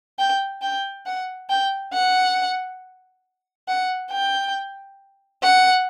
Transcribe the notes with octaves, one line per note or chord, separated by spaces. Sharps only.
G5
G5
F#5
G5
F#5
F#5
G5
F#5